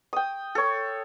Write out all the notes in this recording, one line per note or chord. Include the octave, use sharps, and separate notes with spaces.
G5 D#6
A4 C#5